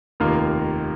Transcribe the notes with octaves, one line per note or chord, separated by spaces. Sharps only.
F1 D#2 D#3 A#3 F4